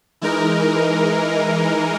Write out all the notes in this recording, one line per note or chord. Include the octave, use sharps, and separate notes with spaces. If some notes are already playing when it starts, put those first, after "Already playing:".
E3 G#3 D#4 A#4